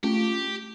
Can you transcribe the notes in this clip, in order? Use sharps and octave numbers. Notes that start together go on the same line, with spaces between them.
A3 C#4 F4 G4